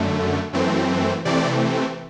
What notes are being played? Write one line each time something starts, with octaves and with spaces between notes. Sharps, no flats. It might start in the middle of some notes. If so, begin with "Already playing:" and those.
Already playing: F#2 D3 A3
F#2 E3 A3 C4
C3 E3 A3 C4 D5